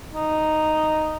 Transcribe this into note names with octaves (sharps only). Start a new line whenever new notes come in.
D#4